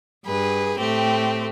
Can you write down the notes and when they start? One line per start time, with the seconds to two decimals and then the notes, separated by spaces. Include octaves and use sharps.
0.25 G2 G#4 B4
0.79 A2 A3 C4 G4